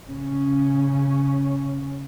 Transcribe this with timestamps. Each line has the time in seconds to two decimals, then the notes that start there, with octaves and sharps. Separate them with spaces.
0.10 C#3 C#4